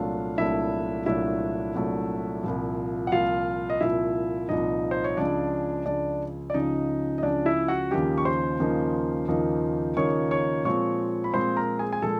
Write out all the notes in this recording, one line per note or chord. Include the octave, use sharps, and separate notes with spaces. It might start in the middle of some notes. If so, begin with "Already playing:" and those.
Already playing: C2 A#2 F#3 A3 D4 F4 F5
C2 A#2 F#3 A3 D4 E4 E5
C2 A#2 F#3 A3 D4 E4 E5
C2 A#2 F#3 A3 D4
C2 A#2 F3
F#5
C2 A#2 F3 F4 F5
D#5
C2 A#2 F3 E4 E5
C2 A#2 F3 D#4 D#5
C5
C#5
C#2 C#3 F3 D4 D5
C#2 C#3 F3 D4 D5
D5
C#2 C#3 F3 D#4 D#5
D#5
C#2 C#3 F3 D4 D5
E4 E5
F#4 F#5
D#2 C#3 F3 A#3 D#4 G4 G5
C#6
C5 C6
D#2 C#3 F3 A#3 D#4
D#2 C#3 F3 A#3 D#4
D#2 C#3 F3 A#3 D#4 C#5 C#6
C#5 C#6
A#2 F3 G#3 C4 C#5 C#6
B5
A#2 F3 G#3 C4 C5 C6
A#4 A#5
G#4 G#5
G#5
A#2 F3 G#3 A4 A5